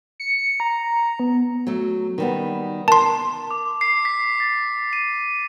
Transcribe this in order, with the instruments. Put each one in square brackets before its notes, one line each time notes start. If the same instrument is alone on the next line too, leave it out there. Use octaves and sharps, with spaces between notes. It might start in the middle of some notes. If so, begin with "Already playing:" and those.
[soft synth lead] C#7
A#5
B3
[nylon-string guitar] F#3 A3
D#3 G3 B3
[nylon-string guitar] A#4 [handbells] A5 C6
[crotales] D6
C7
B6
A6
D#7